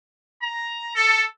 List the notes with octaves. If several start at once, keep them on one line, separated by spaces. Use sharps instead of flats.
A#5
A4